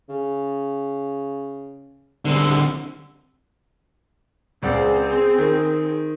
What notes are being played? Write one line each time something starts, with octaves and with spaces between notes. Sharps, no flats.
C#3
C2 D3 C4
C#2 C4 G#4 D5 F#5
D#3